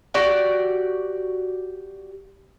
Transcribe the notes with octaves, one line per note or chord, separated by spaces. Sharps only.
F#4 G4 D5 F#5